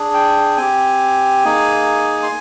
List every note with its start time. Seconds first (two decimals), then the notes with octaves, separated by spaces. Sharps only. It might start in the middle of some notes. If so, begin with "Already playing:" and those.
Already playing: D4 G#4
0.14 G5
0.57 C4 G4 G#5
1.45 A#3 D#4 G#4
2.23 C6